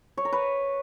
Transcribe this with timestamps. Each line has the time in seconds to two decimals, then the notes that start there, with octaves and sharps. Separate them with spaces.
0.17 C#5
0.25 A#4
0.33 B4